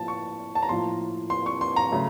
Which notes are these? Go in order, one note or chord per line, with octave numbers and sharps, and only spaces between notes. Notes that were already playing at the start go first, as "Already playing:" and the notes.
Already playing: A2 F3 A#3 A5
C#6
A5
A#5
A2 F3 A#3 C6
C6
C#6
C6
A#5
C#3 F#3 A3